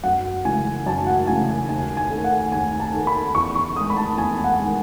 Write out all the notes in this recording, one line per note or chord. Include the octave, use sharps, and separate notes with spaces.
F#2 F#5
C#3 E3 G#3 G#5
F#2 A5
F#5
C#3 E3 G#3 G#5
G#5
D#2 G#5
G#5
D#3 A3
F#5
D#2 G#5
A5
D#3 A3
B5
E2 C#6
C#6
D#3 G#3 D#6
B5
A5
E2 G#5
F#5
D#3 G#3